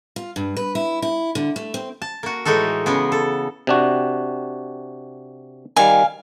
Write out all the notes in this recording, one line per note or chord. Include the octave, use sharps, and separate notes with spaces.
F4
G2
B4
E4
E4
D3
A3
C4
A5
A#3 F#4
A2 E3 G#3 D#4 F#4 A4
C#3 G#3 B3
A4
C3 D4 F#4
D#3 G3 F5 G#5